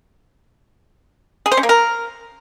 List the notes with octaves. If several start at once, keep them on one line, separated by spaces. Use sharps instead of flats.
G#4
C5
C#4
A#3
A#4